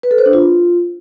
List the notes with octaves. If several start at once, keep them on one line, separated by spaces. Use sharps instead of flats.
B4
A4
C5
D4
F4